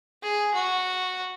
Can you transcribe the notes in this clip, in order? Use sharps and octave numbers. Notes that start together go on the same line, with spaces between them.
G#4
F#4